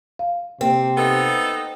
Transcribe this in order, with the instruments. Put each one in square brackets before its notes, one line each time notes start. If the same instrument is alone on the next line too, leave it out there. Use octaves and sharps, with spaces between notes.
[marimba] F5
[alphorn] C3 [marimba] A#3 [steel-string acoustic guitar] C4
[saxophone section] B3 D#4 A4